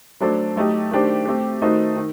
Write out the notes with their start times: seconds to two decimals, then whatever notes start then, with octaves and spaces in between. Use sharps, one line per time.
0.20 F#3 A3 D4 A4 C5
0.56 F#3 A3 D#4 G4
0.90 D#3 A3 D4 G4 C5
1.26 A3 C4 G4
1.62 D#3 A3 D#4 F#4 C5
1.96 D#3